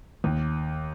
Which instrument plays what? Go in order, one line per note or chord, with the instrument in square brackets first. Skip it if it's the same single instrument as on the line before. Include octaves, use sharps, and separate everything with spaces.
[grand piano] D#2